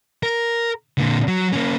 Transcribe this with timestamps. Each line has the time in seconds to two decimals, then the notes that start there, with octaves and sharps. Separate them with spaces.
0.23 A#4
0.98 A#2 D3
1.28 F#3
1.53 A#3 C#4